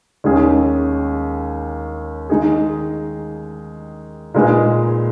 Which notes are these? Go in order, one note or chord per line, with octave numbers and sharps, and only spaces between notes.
D#2 D#3 G#3 C#4 G#4
D#3 G#3 D#4 G#4
A#2 G#3 D#4 G#4 B4